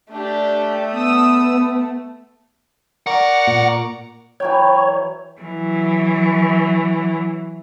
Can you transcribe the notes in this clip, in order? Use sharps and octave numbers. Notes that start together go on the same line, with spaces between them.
A3 D4 G4
B3 D#6 E6
A#4 D5 F#5 C#6
A#2
E3 F#3 C#5 G5
E3 F#3